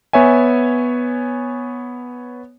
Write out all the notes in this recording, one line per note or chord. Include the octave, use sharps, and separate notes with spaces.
B3 C#5 E5 G#5